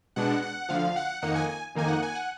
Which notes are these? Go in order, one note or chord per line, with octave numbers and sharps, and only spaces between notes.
B2 G#3 B3 D4 F#5
F#5
D2 D3 F3 F5
F#5
F2 D#3 A#3 D#4 F#5
G#5
G#5
F2 D#3 A#3 D#4 G#5
F#5
G#5
F#5